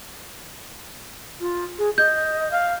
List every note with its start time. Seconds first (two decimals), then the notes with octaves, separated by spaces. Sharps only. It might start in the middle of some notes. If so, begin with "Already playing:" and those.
1.40 F4
1.79 G#4
1.98 D#5 G6
2.51 F5